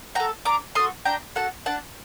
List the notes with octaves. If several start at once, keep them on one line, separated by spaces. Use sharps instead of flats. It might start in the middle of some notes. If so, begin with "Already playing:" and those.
F#4 A4 G5 A#5
D4 A#5 D6
F#4 A4 C6 D#6
D4 G5 A#5
F#4 A4 F#5 A5
D4 F#5 A5